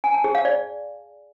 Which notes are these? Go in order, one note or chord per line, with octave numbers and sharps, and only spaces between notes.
G#5
A5
G#4
F5
D5